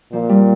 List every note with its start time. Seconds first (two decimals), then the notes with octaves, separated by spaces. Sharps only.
0.12 A#2 F3
0.29 G3